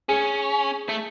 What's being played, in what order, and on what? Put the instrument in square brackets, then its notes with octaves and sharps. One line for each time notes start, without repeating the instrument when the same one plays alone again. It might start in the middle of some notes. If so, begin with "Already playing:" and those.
[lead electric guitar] C#4 [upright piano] G#4
[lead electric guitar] A3